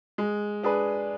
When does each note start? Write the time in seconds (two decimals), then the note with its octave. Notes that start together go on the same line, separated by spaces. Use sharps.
0.18 G#3
0.63 D4 G#4 B4